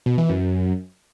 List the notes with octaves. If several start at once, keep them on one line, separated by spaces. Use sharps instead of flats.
B2
E3
F#2